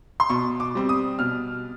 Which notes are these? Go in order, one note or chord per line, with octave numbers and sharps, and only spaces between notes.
C6
B2 C#6
D6
G3 C4
D#6
B2 F6